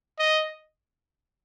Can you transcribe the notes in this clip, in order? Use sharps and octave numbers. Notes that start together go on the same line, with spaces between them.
D#5